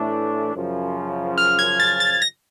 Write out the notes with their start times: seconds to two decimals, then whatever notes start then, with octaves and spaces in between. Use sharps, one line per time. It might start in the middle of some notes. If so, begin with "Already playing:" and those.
Already playing: A2 E3 A3 D4
0.54 F#2 C#3 F3
1.38 F6
1.59 G#6
1.80 A6
2.00 A6
2.22 A#6